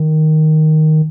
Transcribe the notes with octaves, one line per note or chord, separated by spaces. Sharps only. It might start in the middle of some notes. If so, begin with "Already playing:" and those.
Already playing: D#3